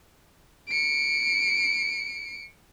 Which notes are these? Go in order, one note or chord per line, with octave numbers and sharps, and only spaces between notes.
C#7 D7